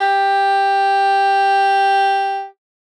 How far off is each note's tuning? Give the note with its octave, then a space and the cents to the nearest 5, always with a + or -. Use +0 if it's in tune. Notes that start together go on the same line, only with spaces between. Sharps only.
G4 +5